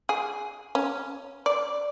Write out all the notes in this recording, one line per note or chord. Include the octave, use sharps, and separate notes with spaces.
G#4
C#4
D5